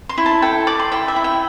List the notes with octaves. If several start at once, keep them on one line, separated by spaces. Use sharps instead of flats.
C6
E4
A5
A4 G5
D5 D6
C6
E4 G5
E5
E4
G5